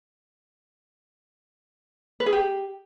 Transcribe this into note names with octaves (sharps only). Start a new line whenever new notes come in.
B4
G#4
G4